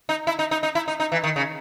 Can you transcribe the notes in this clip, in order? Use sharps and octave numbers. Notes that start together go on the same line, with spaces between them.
D#4
E4
D#4
D#4
D#4
E4
D#4
D#4
E3
D#3
C#3